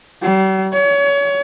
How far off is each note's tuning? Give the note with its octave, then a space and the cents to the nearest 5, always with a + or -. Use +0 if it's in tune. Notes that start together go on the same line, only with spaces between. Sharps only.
G3 -45
C#5 +30